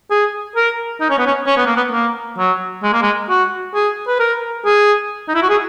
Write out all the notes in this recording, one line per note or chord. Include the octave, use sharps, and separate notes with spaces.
G#4
A#4
D#4
C#4
B3
C#4
C#4
B3
A#3
B3
A#3
F#3
G#3
A#3
G#3
F#4
G#4
B4
A#4
G#4
D#4
E4
F#4
G#4